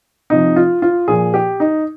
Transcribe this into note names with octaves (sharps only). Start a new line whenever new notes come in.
C3 F3 D#4
F4
F4
A#2 F3 G#4
G4
D#4